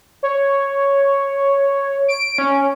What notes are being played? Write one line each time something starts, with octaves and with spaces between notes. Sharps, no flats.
C#5
D7
C#4